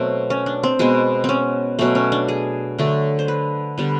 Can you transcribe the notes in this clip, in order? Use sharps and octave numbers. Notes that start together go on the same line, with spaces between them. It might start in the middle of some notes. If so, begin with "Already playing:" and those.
Already playing: B2 F#3 A3 C4
C#4
D4
C4
B2 G#3 B3
C4 C#4
B2 F#3 A3 C#4
C#4
D4
G#4
D3 F#3 A3 A4
C5
B4
D3 G3 B3